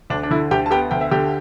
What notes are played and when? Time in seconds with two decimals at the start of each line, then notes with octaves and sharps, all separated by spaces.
0.10 D2 D4
0.23 D4
0.31 D3 E4
0.51 D2 G4 G5
0.66 A5
0.71 B3 G4 G5
0.91 D2 G5
1.01 E5
1.11 D3 G4 G5